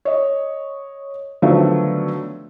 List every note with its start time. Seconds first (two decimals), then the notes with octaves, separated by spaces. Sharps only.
0.05 C#5 D#5
1.42 D3 D#3 F3 F#3 A3 B3